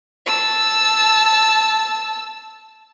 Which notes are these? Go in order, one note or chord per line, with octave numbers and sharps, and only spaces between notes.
A5 E6